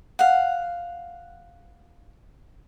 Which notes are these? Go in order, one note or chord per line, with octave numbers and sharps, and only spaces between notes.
F5 F#5